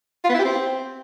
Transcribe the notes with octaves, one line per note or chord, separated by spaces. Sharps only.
F4
B3
E4
G4
C4